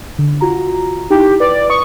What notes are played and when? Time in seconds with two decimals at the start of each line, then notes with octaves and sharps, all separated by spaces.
0.18 D3
0.41 F4 F#4 A#5
1.10 D#4 E4 G4
1.40 B4 D5
1.70 C#6 D#6